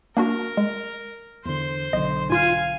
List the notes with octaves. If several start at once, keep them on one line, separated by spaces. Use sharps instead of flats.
A#3 D4 F#4 A#4
G#3
E2 D3 C5 C6
B1 D3 D#5
G#2 F4 F5 G#5